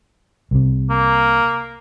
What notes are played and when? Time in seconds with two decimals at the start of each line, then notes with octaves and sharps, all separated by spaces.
0.51 C2 C3
0.90 A#3